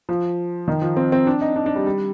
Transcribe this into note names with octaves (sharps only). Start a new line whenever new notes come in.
F3
D#3
F3
C4
C4
D4
D#4
D4
D4
G3
G3